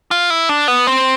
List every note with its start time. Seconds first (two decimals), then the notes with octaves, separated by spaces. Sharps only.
0.11 F4
0.30 E4
0.49 D4
0.68 B3
0.87 C4